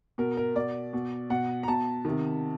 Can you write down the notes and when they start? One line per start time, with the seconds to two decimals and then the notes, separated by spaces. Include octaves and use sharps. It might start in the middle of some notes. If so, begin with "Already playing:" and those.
0.18 B2 A#4
0.37 A#4
0.55 B2 D5
0.93 B2
1.30 B2 F#5
1.63 A#5
1.68 B2 A5
2.05 C3 D#3